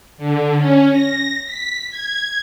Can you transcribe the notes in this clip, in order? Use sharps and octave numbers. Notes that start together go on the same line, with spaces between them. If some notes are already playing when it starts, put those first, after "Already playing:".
D3
C#4
A#6
B6
G#6